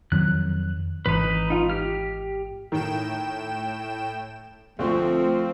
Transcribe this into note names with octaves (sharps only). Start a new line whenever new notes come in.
F2 D#3 F#3 F#6
G#1 E3 D#4 B4
D#4 F4
G4 F6
A2 D#3 G5 E7
D2 F3 A3 C4